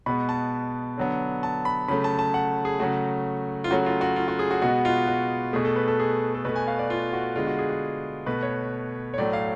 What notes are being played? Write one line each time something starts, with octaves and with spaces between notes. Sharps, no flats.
B2 G#3 B3 B5
A5
D3 F#3 B3
A5
B5
C#3 F#3 A3 B5
A5
A5
F#5
G#4
C#3 F#3 A3 F#4
F4
C#3 F#3 A3 F#4
F4
F#4
F4
F#4
G#4
F#4
B2 G#3 B3 F#4
F4
F#4
B2 A3 G#4
A4
B4
A4
G#4
A4
B2 A3 B4
G#5
F5
D5
F4
F#4
D3 G#3 B3 F4
F#4
G#4
F#4
B2 A3 B4
C#5
C#5
A2 F#3 A3 D5
F5